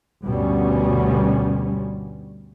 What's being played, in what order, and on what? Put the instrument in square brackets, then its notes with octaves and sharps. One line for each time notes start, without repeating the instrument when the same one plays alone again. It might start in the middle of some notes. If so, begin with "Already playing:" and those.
[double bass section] D2 G2 B2 G3 C#4